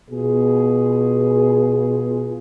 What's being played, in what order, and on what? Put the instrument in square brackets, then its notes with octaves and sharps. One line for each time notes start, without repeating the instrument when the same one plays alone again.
[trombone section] B2 F4 G#4